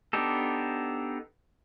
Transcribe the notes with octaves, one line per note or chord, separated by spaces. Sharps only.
B3 D4 D#4 G4 A4